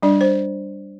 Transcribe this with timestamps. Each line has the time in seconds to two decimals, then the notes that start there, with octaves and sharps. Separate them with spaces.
0.02 G3 D4 D5
0.21 C5